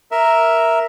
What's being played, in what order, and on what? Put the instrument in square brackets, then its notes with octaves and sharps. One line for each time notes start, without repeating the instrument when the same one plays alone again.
[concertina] A#4 E5